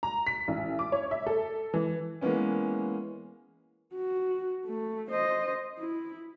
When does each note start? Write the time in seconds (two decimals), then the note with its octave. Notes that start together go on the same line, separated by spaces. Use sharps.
0.03 A#5
0.27 B6
0.48 A1
0.79 D6
0.92 C#5
1.11 E5
1.27 A4
1.74 E3
2.21 E3 G#3 A#3 B3 C#4
3.94 F#4
4.66 A3
5.10 C5 D#5
5.78 E4